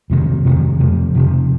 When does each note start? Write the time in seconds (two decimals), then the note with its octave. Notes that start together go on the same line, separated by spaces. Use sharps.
0.10 F2 C3 D#3 F#3
0.44 F2 C3 D#3 F#3
0.79 F2 C3 F3
1.14 F2 C3 F3